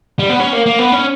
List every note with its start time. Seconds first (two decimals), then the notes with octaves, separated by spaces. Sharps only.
0.19 G3
0.30 B3
0.39 C#4
0.53 A#3
0.66 A#3
0.79 B3
0.92 C#4